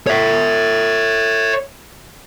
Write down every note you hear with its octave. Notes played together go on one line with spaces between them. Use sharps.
C#5 E5